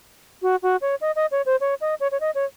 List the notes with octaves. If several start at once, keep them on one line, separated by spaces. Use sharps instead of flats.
F#4
F#4
C#5
D#5
D#5
C#5
C5
C#5
D#5
C#5
C#5
D#5
C#5